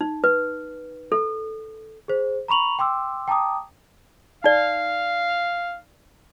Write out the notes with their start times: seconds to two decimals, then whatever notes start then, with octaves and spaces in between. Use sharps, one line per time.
0.01 D#4
0.24 B4
1.12 A4
2.08 G#4 C5
2.48 A#5 B5 C#6 F7 F#7
2.79 G5 C6 D6 E6
3.28 G5 A5 A#5 D6 D#6
4.44 D#4 D5 F5